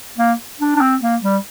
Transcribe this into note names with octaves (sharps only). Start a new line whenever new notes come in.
A#3
D4
D4
C4
A#3
G3